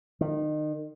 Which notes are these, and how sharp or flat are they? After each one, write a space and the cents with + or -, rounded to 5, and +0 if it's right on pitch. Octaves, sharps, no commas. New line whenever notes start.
D#3 -30